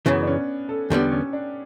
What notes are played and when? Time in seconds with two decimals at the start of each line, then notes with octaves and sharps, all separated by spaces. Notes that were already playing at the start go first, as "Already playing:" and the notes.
0.06 F#2 C#3 E3 B3
0.23 D4
0.27 C#4
0.69 A4
0.90 E2 D3 G3 B3 G4
1.12 C#4
1.33 D4